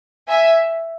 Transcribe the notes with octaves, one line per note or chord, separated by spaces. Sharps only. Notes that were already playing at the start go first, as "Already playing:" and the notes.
E5 G#5